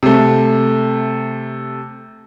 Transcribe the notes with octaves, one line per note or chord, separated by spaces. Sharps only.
C3 A3